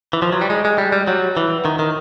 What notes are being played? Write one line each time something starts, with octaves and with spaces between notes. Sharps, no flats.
E3
F3
F#3
G3
G#3
G#3
G3
G3
F#3
E3
D#3
D#3